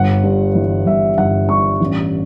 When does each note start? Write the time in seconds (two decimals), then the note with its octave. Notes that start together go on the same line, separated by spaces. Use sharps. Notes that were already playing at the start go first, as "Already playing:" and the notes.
Already playing: G1 F#5
0.24 G2
0.55 E3
0.86 G1 E5
1.18 G1 F#5
1.49 G2 C#6
1.81 A1